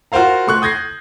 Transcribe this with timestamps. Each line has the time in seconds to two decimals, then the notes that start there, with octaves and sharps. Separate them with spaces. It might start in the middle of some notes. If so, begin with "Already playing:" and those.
0.12 F4 F#4 A#4 C5 F5 A#5
0.47 A3 C6 C#6 F#6
0.62 D#6 G6 G#6 A#6 C7